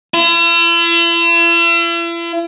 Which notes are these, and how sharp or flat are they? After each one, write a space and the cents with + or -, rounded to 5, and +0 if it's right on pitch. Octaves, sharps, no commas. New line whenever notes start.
E4 +45